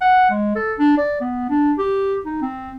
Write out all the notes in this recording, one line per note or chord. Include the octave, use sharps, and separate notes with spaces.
F#5
G#3
A4
D4
D5
B3
D4
G4
D#4
C4